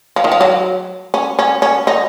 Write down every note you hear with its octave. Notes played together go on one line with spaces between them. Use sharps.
F3
D#3
F3
F#3
C#4
C#4
C#4
D#4